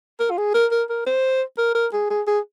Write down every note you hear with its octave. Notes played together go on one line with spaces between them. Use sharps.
A#4
F4
G#4
A#4
A#4
A#4
C5
A#4
A#4
G#4
G#4
G#4